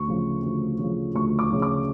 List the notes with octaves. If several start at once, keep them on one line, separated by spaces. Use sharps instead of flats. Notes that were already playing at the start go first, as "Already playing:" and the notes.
Already playing: D2 C#6
C#3 F3
D2
C#3 F3
D2 C#6
D6
C#3 F3
D6